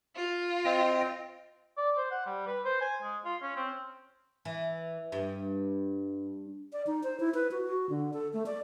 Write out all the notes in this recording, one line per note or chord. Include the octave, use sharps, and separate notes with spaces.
F4
C4 D#5 G5
D5
C5
F#5
G3
B4
C5
G#5
G#3
F4
C#4
C4
E3
G2
D5
D#4
C5
E4
B4
F#4
F#4
D3
A4
A3
D5